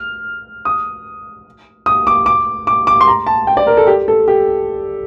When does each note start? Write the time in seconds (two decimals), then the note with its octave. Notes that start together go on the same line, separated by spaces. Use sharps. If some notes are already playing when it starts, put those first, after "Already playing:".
Already playing: F6
0.65 D#6
1.86 D#6
2.07 D6
2.26 D6
2.67 D6
2.87 D6
3.01 C6
3.07 A#5
3.26 A5
3.47 G5
3.57 D5
3.67 A#4
3.77 A4
3.87 G4
4.08 A4
4.28 G4